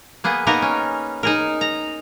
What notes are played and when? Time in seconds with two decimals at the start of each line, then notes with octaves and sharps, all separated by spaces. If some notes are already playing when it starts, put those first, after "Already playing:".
0.24 A#3 B3 G#4
0.47 A#3 B3 D#4 A#4
0.62 C#4
1.23 D#4 G#4 A#4
1.61 A#5